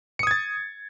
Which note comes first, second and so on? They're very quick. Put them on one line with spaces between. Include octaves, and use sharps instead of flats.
C#7 D#6 G#6 A6